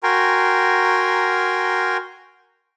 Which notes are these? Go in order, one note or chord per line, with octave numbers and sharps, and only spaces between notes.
F#4 A#4 G5 G#5 A#5 C6